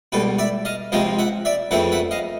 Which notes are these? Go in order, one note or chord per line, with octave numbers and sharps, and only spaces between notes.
C#2 B2 G3 A4 B4
D5 E5
D#5 F5
C#2 C3 F3 G#3 C4 D#5 F5
E5 F#5
D5 E5
F2 C#3 E3 A3 C4 E5 F#5
E5 F#5
D#5 F5